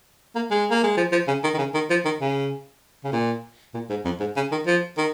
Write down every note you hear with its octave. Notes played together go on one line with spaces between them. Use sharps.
A#3
G#3
A#3
G#3
F3
F3
C#3
D#3
D#3
C#3
D#3
F3
D#3
C#3
C#3
A#2
A#2
G#2
F2
G#2
C#3
D#3
F3
D#3